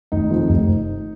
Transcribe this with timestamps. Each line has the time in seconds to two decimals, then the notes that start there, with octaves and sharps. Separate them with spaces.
0.12 F1 D#3 D#4
0.30 F2 D#3
0.49 F1